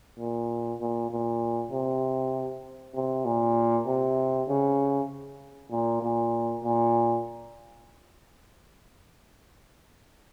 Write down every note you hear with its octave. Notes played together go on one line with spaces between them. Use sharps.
A#2
A#2
A#2
C3
C3
A#2
C3
C#3
A#2
A#2
A#2